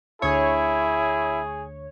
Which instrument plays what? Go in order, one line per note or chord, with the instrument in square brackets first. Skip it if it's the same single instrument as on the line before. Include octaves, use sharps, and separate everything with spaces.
[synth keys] D2 C#5 [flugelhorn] E4 [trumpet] G#4